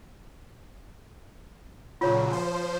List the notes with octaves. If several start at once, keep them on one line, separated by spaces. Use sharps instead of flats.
A#2 C#3 F#3 F4 C#5
F3 C5